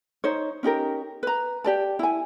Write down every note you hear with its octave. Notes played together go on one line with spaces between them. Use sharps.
D#4 C5 C#5
C#4 D#4 G4 A#4
B4 A#5
G4 D5 A5
E4 G#5